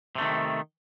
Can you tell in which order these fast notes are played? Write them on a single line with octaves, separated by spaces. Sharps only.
C3 A3 D#3